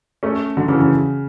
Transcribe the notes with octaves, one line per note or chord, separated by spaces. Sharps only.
A3 C#4
D3 F#3
C#3 E3
C#3